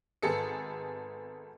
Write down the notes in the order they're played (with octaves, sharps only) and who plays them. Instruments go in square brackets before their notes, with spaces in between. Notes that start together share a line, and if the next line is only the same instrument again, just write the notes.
[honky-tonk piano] G#1 B3 G#4 A4 C#7